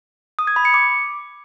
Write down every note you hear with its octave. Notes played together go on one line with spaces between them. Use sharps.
D#6
G#6
B5
C#7
D6